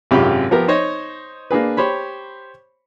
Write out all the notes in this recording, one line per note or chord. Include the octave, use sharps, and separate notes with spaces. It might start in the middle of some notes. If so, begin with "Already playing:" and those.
G#1 F#2 C3 F4 G4 B5
F3 B3 G4 A#4
D#4 C5 C#5 D#5
A#3 D4 G#4 B4
G4 C5 C#5 B5